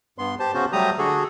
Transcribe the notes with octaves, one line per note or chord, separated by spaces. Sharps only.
G2 B3 C6
G4 C5 A5
C#3 B3 C#4 F#4 C5
F#3 G3 A3 G4 A#5 D#6
D3 F#4 G#4 A4